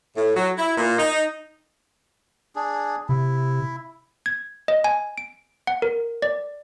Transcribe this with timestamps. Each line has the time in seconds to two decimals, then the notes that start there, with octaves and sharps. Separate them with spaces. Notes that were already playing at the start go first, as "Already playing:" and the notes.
0.16 A2
0.35 F#3
0.57 E4
0.77 A#2
0.98 D#4
2.56 D4 G#4
3.09 C3 E4
4.26 G#6
4.68 D#5
4.84 G#5
5.18 D7
5.67 F#5
5.82 A#4
6.22 D5